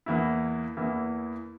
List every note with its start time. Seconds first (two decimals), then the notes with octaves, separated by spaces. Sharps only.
0.06 E2 E3 A#3 E4
0.77 E2 E3 A#3 E4